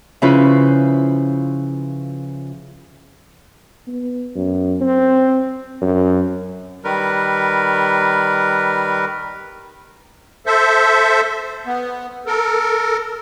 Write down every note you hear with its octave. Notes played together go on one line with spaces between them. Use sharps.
C#3 F3 C#4 E4 F4 B4
B3
F#2
C4
F#2
D#3 G3 A#4 B4
A4 C5 E5
B3
A4 A#4